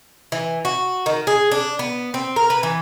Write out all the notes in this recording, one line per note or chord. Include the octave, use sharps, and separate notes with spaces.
E3
F#4
D#3
G#4
D4
B3
C4
A#4
B4
E3